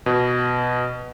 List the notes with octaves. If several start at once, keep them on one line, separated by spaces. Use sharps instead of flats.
B2